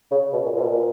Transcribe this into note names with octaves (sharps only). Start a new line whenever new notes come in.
C#3
B2
A#2
A#2
B2
A#2